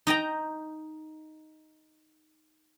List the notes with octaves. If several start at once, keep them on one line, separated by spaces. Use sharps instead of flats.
D#4 D#5 G5 A#5